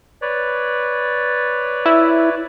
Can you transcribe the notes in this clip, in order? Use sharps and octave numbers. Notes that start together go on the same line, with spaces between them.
B4 C#5 D5
E4